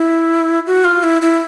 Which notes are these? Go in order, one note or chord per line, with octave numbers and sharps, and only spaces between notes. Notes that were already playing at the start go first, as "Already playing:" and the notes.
Already playing: E4
F#4
F4
E4
E4